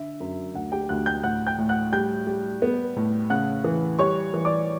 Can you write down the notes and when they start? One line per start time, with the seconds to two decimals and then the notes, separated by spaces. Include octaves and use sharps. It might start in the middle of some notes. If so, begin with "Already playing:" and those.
Already playing: D3 E5
0.20 F#2
0.55 D2 F#5
0.72 G4 G5
0.89 D2 F#5 F#6
1.06 G5 G6
1.24 A2 F#5 F#6
1.47 G5 G6
1.58 A2
1.69 F#5 F#6
1.92 G3 G5 G6
2.27 G3
2.62 B3
2.97 A2
3.30 C#3 F#5 F#6
3.64 E3
3.99 G3 C#5 C#6
4.34 E3
4.45 D5 D6